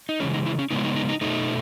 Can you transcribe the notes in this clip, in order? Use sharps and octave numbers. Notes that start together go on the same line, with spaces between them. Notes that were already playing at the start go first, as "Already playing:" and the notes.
D#4
C#3 E3 G#3 C#4
D#4
E4
C#4
C#3 G#3 B3 D#4
E4
D#4
D#4
D#4
B2 A3 D#4